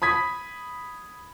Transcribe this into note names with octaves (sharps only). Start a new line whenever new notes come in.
B5 D#6 G#6 B6